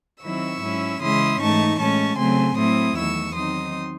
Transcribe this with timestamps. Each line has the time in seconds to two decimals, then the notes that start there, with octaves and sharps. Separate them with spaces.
0.24 D#3 F#3 C4 E4 C#6 E6
0.63 G#2 F#3 C#4 E4
1.02 C#3 E3 G#3 C#4 E4 C6 D#6
1.41 G#2 E3 A3 D#4 A5 C#6
1.80 A2 G#3 C#4 A5 C#6
2.19 C#3 F#3 A3 C4 G#5 C6
2.58 A2 F#3 A3 C4 E4 C6 D#6
2.97 E2 D#3 F#3 A3 C#6 E6
3.36 D#3 F#3 C4 D#4 C6 D#6